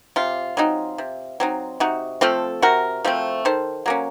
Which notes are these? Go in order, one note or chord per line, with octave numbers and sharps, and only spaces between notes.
C3 F4
F#3 C4 D#4
C3
F#3 C4 D#4
C3 D#4 F#4
F3 A3 C4 F4 A4
C3 F#4 A#4
F3 A3 C4
D#3 A4 C5
F#3 A#3 C#4